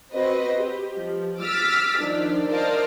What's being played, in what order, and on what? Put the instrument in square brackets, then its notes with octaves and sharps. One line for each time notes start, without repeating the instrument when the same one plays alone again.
[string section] C4 F#4 B4 C5 D#5
G4
F3
D6 E6 F6 A6 B6
D#3 F3 D4
A#4 C5 D5 D#5 F5 A5